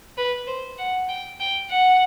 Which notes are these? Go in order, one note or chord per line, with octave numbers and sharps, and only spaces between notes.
B4
C5
F#5
G5
G5
F#5